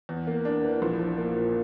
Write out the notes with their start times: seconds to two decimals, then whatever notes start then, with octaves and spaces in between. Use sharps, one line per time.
0.09 E2
0.27 A#3
0.45 D4
0.64 E3
0.82 A#1
0.99 F3
1.18 A#3
1.36 A#2